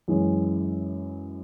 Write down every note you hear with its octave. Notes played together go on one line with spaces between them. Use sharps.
F#2 E3 G#3 C#4